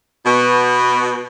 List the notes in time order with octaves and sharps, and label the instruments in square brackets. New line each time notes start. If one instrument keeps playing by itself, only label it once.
[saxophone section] B2